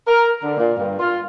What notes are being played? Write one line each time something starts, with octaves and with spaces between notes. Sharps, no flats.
A#4
D3
A#2
G2
F4